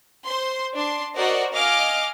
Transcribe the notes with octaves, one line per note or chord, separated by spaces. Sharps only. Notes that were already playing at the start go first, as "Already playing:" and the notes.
C5 C6
D4 C6
F#4 A#4 C5 D5 D#5 F#5
D#5 F5 G#5 D6 F6